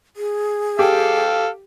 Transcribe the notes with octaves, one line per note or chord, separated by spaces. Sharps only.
G#4
G4 A4 F5